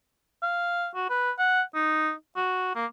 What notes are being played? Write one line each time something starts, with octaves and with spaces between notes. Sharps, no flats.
F5
F#4
B4
F#5
D#4
F#4
A#3